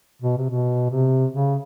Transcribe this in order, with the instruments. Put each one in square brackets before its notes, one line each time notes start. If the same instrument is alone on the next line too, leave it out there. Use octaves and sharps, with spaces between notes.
[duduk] B2
C3
B2
C3
C#3